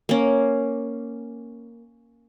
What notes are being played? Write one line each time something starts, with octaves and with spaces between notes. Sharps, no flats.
A#3 C#4